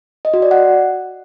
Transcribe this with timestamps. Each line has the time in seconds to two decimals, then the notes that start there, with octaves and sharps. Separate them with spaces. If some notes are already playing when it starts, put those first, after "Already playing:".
0.25 D#5
0.34 F#4
0.42 D5
0.51 F#5